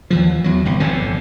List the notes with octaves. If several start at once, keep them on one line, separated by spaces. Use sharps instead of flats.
D#2 E3 F3
E2 F#3
G1 C2
G1 F2 A#2 D3